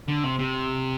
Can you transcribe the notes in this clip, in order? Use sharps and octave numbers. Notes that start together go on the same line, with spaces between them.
D3
C3
C3